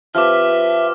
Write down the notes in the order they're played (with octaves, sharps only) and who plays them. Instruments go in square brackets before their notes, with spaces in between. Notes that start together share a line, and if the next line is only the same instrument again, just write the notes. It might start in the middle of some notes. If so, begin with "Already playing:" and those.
[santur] F3 C4 G4 [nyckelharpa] B4 [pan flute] E5 [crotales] D6 F6